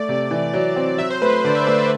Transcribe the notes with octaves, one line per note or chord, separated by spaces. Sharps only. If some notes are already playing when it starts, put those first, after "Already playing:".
Already playing: A3 D5
C3
E3
F#3
C4
F#3 E5
C5
A3 B4
C5
D3 D5
E5
A3 D5
B4